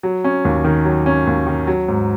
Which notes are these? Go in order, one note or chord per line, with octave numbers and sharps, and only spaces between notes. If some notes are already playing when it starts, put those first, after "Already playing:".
F#3
C#4
D#2
D#3
F#3
C#4
D#2
D#3
F#3
G#2